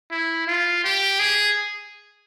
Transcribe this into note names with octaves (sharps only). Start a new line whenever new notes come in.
E4
F4
G4
G#4